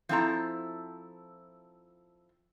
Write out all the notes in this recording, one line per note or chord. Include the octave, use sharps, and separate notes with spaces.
F3 C4 E4 A4 A#5